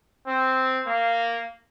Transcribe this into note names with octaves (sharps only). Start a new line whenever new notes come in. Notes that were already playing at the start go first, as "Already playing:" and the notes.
C4
A#3